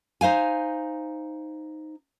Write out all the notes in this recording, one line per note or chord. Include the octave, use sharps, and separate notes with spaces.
D#4 C5 F5 G#5